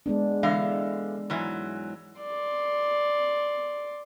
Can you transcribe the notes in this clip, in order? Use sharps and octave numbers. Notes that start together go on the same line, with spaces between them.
G#3 B3 D4
D3 E3 G#3 F5
G#2 E3 F#3
D5 C6